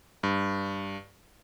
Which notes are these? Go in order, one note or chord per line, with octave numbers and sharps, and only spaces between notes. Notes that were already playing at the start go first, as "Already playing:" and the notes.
G2